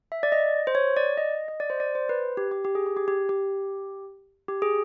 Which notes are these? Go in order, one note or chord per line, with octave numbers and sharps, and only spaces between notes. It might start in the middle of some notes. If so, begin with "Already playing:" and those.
E5
D5
D#5
C5
C#5
D5
D#5
D#5
D5
C5
D5
C5
B4
G4
G4
G4
G#4
G4
G4
G4
G4
G4
G#4